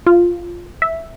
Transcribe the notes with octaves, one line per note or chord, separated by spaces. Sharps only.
F4
E5